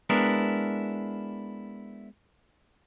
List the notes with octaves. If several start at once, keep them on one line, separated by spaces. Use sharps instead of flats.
G#3 B3 D4 E4 A#4